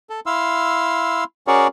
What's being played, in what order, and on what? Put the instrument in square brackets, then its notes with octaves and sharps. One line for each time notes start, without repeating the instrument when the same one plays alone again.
[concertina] A4
E4 F5 C6 E6
C#4 F#4 G#4 A#4 C#5 D5